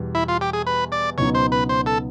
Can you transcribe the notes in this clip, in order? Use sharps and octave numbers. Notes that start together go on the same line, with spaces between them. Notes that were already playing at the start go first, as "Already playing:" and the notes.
Already playing: E2 B2 G3
E4
F4
G4
G#4
B4
D5
C#2 B2 F#3 B3 D#4 C#5
C5
B4
C5
A4